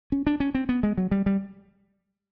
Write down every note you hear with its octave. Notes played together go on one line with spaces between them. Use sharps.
C#4
D4
C#4
C4
B3
G#3
F#3
G3
G3